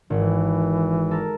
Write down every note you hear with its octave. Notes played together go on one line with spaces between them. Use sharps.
G#1 E3
A4 A#4